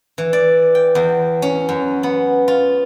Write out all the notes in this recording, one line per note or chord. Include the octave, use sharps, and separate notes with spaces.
E3
D5
G5
E2
C#4
F#2
B3
F4